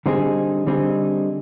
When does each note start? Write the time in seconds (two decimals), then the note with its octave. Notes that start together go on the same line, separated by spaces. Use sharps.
0.06 D3 G3 C4 D#4 G#4
0.67 D3 G3 C4 D#4 G#4